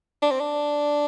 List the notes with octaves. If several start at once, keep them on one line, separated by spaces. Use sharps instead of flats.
D4
C4
D4